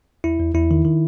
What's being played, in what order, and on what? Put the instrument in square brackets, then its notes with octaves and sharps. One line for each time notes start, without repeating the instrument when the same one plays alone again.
[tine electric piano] E2 E4
E2
E2 E4
D#3
D#3